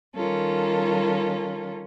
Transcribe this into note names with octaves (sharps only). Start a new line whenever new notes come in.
D#3 G3 C#4 F4 A4 A#4